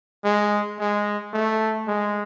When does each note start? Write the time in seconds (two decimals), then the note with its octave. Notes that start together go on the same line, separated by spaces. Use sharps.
0.25 G#3
0.80 G#3
1.34 A3
1.88 G#3